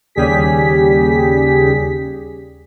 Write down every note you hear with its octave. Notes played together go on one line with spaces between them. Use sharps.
D#2 C#3 G3 G4 G#4 B6